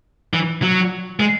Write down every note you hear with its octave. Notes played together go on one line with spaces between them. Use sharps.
E3
F#3
G#3